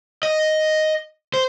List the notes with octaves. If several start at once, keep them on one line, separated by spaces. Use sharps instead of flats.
D#5
C5